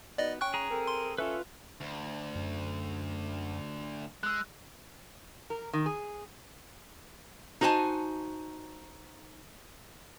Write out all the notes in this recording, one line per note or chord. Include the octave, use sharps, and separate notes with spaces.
B3 D#4 F#4 D5 D#5
C#4 G5 C#6 F#6
G#4 A#5
C4 A4 A#4
C6
C#4 F4 A4 B4 E5
D2
F#2
G#3 E6 F#6
A#4
D#3
G#4
D#4 F#4 C5 G#5 A5